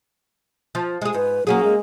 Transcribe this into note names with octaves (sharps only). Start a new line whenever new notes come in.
F3
G#3 G#4
G#2 B4
F#3 A#3 C#4 G#4
G#3